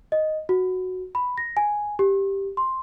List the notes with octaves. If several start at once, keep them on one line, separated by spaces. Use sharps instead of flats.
D#5
F#4
B5
A#6
G#5
G4
C6